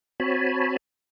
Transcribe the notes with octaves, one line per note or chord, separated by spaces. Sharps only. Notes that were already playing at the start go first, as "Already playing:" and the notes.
C4 F#4 C#5 G#5 A5 B5